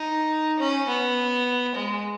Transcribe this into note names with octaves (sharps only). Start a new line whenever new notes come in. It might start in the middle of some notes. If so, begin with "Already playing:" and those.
Already playing: D#4
C#4
B3
G#3